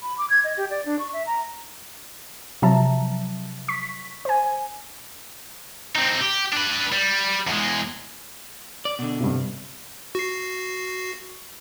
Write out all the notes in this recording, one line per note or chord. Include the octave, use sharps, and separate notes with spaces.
B5
D6
G#6
D#5
G4
D5
D4
C#6
E5
A#5
C3 F3 F#3 E5 A5 A#5
C#6 B6
C5 G#5
C4 D#4
G4
D4 B4
G3
E2 G#3
D5
B2 D3
G2 C3
F#4 C7